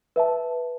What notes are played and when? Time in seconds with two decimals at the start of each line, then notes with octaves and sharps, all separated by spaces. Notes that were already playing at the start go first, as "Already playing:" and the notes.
0.16 B4 E5 A5